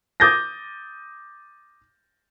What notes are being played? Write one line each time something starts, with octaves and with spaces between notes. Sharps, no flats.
D6 D#6 G6 A6 A#6